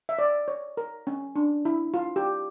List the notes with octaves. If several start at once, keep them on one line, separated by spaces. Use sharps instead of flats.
E5
D5
C#5
A#4
C#4
D4
E4
F4
G4